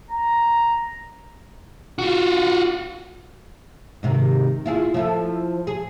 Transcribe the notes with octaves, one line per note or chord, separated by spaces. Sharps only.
A#5
F4 F#4
G#2 C3 D#3
E4 F4 G#4
F3 E4 A4
G#4